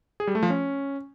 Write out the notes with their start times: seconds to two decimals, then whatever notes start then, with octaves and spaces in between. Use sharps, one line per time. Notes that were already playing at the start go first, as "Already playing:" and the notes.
0.20 G#4
0.27 G3
0.35 A3
0.43 F3
0.50 C#4